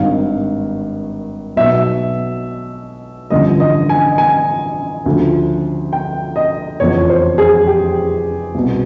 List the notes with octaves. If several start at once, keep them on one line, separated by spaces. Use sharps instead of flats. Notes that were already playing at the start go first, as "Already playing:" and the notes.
Already playing: G#1 G2 D#3 F5
B1 B2 E5
A1 G2 D3 F3 D#5
D#5
G#5
G#5
D2 C#3 F3
G5
D#5
F1 E2 C#3 F3 C#5
C5
G#4
G4
C2 B2